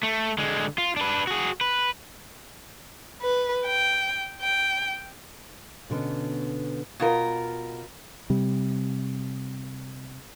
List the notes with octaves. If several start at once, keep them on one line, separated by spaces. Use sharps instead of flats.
A3
D3 G#3
F4
D4 B4
F#4 G#4
B4
B4
G5
G5
B2 D3 B3 C#4
B2 F4 A#4
C3 G3